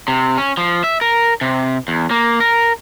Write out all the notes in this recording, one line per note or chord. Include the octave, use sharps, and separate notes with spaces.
C3
C#4
F3
E5
A#4
C3
E2
A#3
A#4